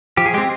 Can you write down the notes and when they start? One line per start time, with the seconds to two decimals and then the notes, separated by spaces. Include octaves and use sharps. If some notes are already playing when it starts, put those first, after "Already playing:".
0.17 F3 G4
0.26 G#4
0.34 G#3 G4
0.38 C4